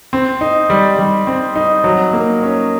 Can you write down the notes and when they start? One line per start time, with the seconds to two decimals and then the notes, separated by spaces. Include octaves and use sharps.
0.13 C4
0.41 D#4
0.70 G3
0.99 G3
1.27 C4
1.56 D#4
1.84 F#3
2.13 A#3
2.42 C#4